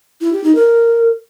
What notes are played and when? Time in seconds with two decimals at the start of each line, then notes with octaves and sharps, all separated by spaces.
0.21 E4
0.32 G4
0.44 D#4
0.55 A#4